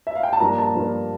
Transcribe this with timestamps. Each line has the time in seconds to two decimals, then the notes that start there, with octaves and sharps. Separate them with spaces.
0.07 E5
0.15 F5
0.23 G5
0.33 A5
0.40 G2 F3 A#3 D4 A#5
0.58 A5
0.75 G2 F3 A#3 D4